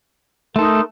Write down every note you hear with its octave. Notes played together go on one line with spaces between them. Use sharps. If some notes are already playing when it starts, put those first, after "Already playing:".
A3 D#4 A4 A#4 C6